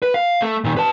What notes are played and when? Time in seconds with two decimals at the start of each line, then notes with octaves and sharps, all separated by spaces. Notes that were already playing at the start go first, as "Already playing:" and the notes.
0.02 B4
0.14 F5
0.42 A3
0.64 A#2 D#3
0.77 B4 A5